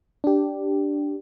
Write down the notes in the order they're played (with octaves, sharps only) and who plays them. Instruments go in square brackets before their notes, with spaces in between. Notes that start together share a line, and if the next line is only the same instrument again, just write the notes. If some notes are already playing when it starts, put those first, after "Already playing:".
[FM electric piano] D4 G4